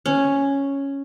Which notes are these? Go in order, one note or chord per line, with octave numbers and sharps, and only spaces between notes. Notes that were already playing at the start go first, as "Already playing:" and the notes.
C#4